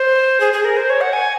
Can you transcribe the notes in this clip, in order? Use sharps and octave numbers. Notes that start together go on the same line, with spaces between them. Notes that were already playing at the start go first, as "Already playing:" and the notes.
Already playing: C5
G#4
G#4
A#4
C5
C#5
F#5
G#5